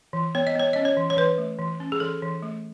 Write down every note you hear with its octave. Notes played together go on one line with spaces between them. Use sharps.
E3
B3 C#5
D#5
B3 C#5
C#4 D#5
C#5
E3
C#5
E3 B4
A3
E3
C#4
G#4
E3 A4
E3
A3